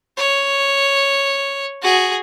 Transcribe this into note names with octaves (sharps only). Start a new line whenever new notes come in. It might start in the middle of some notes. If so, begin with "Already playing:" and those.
C#5
F#4 G#4